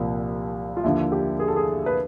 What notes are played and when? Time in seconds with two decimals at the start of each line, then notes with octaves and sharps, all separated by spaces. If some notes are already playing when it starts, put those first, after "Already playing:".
Already playing: C2 A#2 F3
0.77 F4
0.84 D#2 D3 F3 E4
1.12 G4
1.40 G#4
1.48 A4
1.56 G#4
1.86 B4